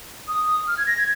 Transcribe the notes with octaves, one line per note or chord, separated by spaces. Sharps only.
D#6
F6
G#6
A#6
G#6